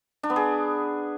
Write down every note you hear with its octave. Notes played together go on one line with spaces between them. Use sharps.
D4
B3
G#4